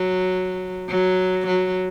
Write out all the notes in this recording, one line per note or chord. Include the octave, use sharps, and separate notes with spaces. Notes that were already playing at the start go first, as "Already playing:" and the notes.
Already playing: F#3
F#3
F#3